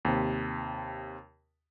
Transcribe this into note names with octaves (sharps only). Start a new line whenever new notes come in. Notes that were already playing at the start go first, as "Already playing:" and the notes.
D#2 C3